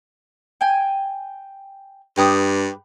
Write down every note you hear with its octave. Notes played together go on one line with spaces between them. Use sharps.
G5 G#5
G2 G4 B4 D#6